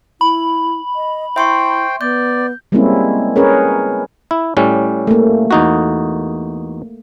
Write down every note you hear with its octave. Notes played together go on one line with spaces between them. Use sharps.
E4 B5
D#5
E4 C5 E5 G5 C6 C#6
B3 D5 G6
G3 G#3 A#3 C4 C#4 E4
C#4 G#4 A#4 B4 C#5
E4
A2 G3 C#4
A3 A#3
E2 D#4 F#4